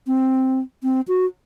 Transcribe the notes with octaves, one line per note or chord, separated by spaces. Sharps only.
C4
C4
F#4